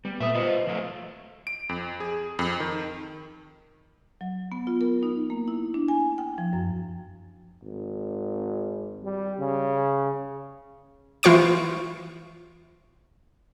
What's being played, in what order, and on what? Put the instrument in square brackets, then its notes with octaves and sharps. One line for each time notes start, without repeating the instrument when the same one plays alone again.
[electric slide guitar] G3 [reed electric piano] B3
[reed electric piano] A#2 B4 D#6 [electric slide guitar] A3 E5
[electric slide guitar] F4 B4 C5 [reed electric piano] D#5
[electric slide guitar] F3 F#3 A3
[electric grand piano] D7
F2
G#4
F2
D#3
[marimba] F#3
B3
F4
A#4
D#4
A#3
E4
D4
G#5
G5
F3
F#2
[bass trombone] G#1
G3
C#3
[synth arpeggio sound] E3 F4 C5 C#6 D7